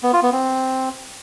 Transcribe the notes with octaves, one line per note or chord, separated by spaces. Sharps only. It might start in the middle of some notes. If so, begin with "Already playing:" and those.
B3
F4
B3
C4